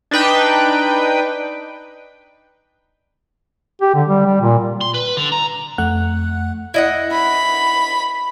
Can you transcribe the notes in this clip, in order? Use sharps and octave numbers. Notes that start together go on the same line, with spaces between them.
D4 D#4 B4 G5
G4
D3
G3
G3
A#2
C6
B4
D3
A#5
F2 A3 F#5 F#6
E4 D#5 F#5
B5